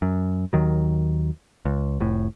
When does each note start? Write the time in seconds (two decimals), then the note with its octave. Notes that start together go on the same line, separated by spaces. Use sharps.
0.02 F#2
0.53 D#2 D#3 F#3
1.65 C#2
2.00 F1 A2